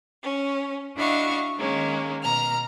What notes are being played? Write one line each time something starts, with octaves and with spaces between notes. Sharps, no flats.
C#4
D4 E4 F#4 D#5 F5 C#6
D#3 G#3 A#3 C#4
B2 A#5 F6